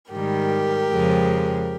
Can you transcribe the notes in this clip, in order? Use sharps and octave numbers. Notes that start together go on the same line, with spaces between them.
G#2 D#3 G3 G4 A#4
F2 C#3 F3 G#3